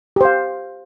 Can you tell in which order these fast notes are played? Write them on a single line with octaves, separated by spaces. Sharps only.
G4 C5 F5